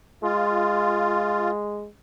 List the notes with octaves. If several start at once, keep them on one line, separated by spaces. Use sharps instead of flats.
G#3 F4